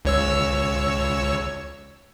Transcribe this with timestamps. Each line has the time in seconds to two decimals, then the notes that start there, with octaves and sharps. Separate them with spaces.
0.05 C#2 C#5 E6